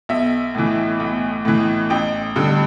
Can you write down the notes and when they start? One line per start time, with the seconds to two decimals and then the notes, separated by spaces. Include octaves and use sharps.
0.09 B1 E5
0.55 A2 E3
1.00 B1
1.45 A2 E3
1.90 A1 G5
2.36 G2 D3